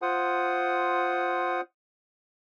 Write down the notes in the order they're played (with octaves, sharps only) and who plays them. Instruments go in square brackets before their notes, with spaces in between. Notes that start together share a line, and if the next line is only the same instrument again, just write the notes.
[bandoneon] F4 C5 F#5 D#6